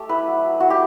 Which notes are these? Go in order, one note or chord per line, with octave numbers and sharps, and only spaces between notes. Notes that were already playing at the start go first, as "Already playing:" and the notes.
Already playing: A3 G4
E4 B4
F#3
F#3
F#3 F#4
G4